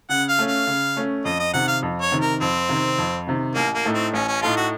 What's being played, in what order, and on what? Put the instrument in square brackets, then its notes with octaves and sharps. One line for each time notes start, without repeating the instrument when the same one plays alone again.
[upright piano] C#3 [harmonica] F#5
[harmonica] F5
[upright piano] A3 C#4
[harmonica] F5
[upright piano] C#3
A3 C#4
[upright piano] F2 [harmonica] D#5
[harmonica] D#5
[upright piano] C3 D#3 [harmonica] F#5
[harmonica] F5
[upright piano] F2
[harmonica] C#5
[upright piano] C3 D#3
[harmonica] A#4
[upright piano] F2 [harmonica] C4
[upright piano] C3 D#3
F2
C3 D#3
[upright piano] A1 [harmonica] A#3
[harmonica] A#3
[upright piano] A2 A3 D#4 A4
[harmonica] C4
[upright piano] A1 [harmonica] C#4
[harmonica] C#4
[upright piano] A2 A3 D#4 A4 [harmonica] F4
[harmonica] F#4